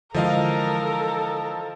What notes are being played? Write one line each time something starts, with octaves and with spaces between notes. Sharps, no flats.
D3 E3 F3 G#3 A4 A#4 D#5 F5